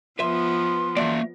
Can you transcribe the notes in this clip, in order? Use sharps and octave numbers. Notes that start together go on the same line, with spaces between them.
F3 B3 B4 E5 C6
E3 A#3 F#4 D5 E5